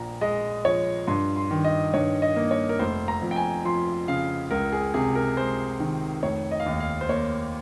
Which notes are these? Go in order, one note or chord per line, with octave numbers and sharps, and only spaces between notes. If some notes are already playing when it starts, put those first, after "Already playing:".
Already playing: A#1 A#2 A#5
G#3 D#5
F3 C#5
G2 C6
C6
D#3
D#5
G2 C#5
D#5
A#3
C#5
A#4
F1 C5
A#5
F2
G5
G#5
F3 C6
C#3 F5
C#2 A#4
G#4
C3 G#4
A#4
G#3 C5
D#3
F1 C#5
D#5
F5
D#2 D#5
F5
C5
A#3 C#5